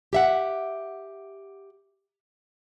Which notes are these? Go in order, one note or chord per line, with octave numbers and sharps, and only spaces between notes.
G4 E5 F#5